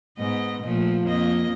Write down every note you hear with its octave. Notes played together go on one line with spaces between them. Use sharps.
G#2 B3 D#5
A#2 F3 A3
F2 A#3 D#5